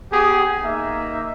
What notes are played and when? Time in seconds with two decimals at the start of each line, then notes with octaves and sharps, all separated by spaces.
0.12 B3 G4 G#4
0.62 A#3 D#4 E5